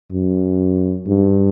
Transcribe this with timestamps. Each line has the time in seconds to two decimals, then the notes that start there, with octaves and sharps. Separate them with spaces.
0.12 F#2
1.08 G2